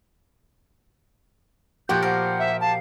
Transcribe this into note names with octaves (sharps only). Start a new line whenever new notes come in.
A#2 F3 F#4 G4 F#6 G6
A#4 C5 F#5
E5
F5 A5